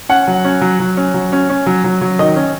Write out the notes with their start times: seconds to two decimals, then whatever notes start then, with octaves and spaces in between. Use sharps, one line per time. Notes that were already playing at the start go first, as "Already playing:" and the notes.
0.09 C#4 F#5
0.27 F#3
0.44 C#4
0.61 F#3
0.80 F#3
0.97 C#4
1.14 F#3
1.32 C#4
1.50 C#4
1.66 F#3
1.84 F#3
2.01 F#3
2.19 D#3 D#5
2.36 C#4